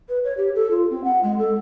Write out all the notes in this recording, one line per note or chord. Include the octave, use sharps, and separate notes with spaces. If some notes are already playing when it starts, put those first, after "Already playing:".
B4
C#5
G4
A4
F4
C4
F#5
G#3
A4